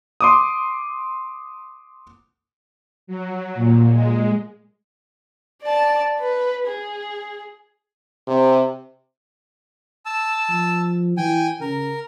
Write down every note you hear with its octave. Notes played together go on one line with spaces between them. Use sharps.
C6 D6 D#6
F#3
A#2
G#3
D5 A5
B4
G#4
C3
A5 E6
F3
E3 G5 G#5
C#3 A#4